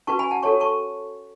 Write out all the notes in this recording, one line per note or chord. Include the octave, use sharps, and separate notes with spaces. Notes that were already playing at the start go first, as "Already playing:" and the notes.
C#4 F#4 B4 A5 C#6
G#5 B5
F#5 A5
F#4 A4 C#5 A5 C#6
A5 C#6